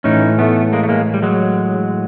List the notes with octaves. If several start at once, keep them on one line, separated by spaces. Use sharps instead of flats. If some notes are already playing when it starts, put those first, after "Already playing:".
A2 E3 C#4 D#4
A3 B3
G#3 A#3
A3
G#3 A#3
G3
F#3 G#3